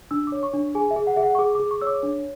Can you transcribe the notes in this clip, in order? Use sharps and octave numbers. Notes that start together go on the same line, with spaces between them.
D4 E6
D6
C#5
C#6
D4
G#4 G#5
E5
G#4
F#5
G#4 E5
F#5
C#6
G#4 D6
G#4 D6
C#6
C#5 E6
D6
D4